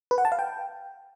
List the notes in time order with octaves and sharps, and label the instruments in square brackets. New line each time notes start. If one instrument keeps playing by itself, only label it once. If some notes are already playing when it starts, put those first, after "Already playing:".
[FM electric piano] B4
F#5
A5
F5
G5